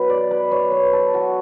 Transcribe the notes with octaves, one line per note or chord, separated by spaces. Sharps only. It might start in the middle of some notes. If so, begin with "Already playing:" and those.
Already playing: B2 F#3 B4
D5
B4
C#5
B4
A4
F#4